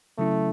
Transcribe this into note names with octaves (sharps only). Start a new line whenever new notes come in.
C#3 F#3 A3 C#4 E4